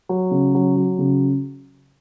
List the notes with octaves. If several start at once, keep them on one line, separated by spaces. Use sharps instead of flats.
F#3
C#3
F#3
F#3
C#3